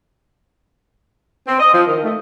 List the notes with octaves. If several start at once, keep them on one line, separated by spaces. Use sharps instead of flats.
C4
D#5
F3
D#3
A3